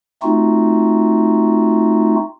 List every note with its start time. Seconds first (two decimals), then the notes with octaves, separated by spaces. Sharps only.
0.23 A3 C4 D#4 F4 F#4